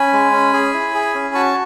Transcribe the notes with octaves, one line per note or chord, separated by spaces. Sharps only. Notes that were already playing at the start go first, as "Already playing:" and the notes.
Already playing: C#4 G#5 B5
G#3
C#4
G#4
E4
G#4
C#4
F#4 A5 C#6